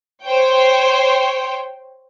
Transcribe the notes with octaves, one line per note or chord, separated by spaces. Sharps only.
C5 C#5 G5